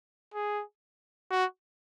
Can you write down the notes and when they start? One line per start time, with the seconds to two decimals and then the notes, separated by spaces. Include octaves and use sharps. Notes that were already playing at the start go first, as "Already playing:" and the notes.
0.34 G#4
1.31 F#4